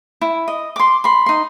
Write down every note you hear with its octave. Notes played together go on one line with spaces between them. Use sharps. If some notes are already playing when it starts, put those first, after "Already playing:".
E4
D#5
C6 D6
B5 C6
D#4 C6